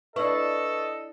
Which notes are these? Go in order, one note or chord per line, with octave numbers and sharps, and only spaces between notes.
D4 E4 A4 B4 D#5 C#6